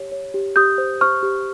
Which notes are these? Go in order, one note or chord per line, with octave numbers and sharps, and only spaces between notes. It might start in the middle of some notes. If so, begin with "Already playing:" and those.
Already playing: G4 C#5
C#5
G4
G4 D#6 G6
C5
C5 C#6 F6
G4